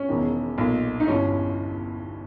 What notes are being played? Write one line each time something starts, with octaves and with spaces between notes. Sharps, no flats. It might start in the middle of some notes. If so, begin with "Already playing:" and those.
Already playing: C#4
E1 E2 D#3
B1 A#2
D#4
G1 G2 E3 C#4